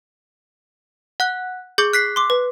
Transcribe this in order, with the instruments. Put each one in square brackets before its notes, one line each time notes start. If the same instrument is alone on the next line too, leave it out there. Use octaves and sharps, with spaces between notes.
[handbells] F#5 F#6
[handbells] G#4 D6 [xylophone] G6
[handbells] F#6 B6 C7
[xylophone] C6 D6
B4